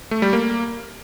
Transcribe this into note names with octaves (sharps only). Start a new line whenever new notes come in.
A3
G3
A#3